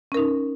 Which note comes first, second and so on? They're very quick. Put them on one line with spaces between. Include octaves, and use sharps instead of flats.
C#4 A#4 D#4